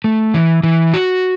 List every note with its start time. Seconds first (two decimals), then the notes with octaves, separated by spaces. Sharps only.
0.04 A3
0.34 E3
0.63 E3
0.94 F#4